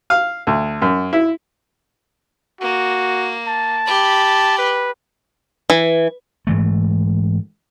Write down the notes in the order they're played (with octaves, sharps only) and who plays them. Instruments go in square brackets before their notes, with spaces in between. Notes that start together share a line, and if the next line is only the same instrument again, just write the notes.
[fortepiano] F5
D2
F#2
E4
[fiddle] A#3 [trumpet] F#4
[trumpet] A5
[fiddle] G4 B5
[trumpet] B4
[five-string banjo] E3
[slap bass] G#2 E3 A3